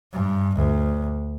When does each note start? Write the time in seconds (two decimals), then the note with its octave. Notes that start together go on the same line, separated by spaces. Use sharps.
0.13 G2
0.56 D2